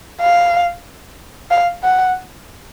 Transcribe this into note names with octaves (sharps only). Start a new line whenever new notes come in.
F5
F5
F#5